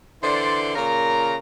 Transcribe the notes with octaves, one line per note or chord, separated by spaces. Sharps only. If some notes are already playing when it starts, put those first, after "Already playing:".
D3 E3 C5 D5 C6
A#2 C#3 A#4 A#5